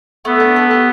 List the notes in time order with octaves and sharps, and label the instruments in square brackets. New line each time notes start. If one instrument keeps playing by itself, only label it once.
[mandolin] A3 [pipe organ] B3
[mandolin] D4
A3
G4